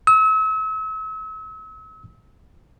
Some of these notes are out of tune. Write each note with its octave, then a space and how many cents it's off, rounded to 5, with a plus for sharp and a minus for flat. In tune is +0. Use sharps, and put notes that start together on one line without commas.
E6 -40